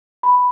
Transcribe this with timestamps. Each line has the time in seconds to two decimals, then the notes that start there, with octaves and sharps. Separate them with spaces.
0.23 B5